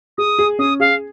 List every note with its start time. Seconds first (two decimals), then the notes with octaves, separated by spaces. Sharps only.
0.18 G#4 D#6
0.39 G#4
0.59 C#4 D#6
0.80 G#4 F5